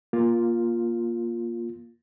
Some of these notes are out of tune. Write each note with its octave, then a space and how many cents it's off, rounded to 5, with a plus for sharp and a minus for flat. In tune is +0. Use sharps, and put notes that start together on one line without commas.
A#3 +20 F4 +0